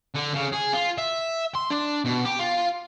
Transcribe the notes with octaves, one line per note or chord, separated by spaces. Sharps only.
D3
C#3
G#4
F4
E5
C6
D4
B2
G4
F4